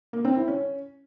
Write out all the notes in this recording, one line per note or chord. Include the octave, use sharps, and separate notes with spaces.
A#3
C4
E4
C#4